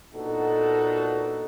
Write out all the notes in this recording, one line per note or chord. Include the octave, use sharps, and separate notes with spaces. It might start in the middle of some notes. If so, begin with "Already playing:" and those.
A#2 B3 D4 D#4 F#4 A4